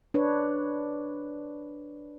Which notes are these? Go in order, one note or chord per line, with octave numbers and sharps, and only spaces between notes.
D4 B4 C#5